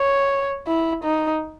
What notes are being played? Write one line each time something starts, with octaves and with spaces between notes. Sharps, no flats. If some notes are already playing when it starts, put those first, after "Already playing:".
Already playing: C#5
E4
D#4